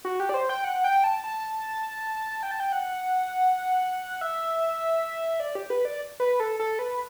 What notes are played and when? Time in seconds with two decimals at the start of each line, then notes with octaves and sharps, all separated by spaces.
0.05 F#4
0.20 G4
0.29 D5
0.34 C5
0.49 G5
0.64 F#5
0.84 G5
1.04 A5
1.24 A5
2.43 G5
2.51 A5
2.60 G5
2.72 F#5
4.21 E5
5.40 D5
5.55 G4
5.70 B4
5.85 D5
6.20 B4
6.40 A4
6.60 A4
6.79 B4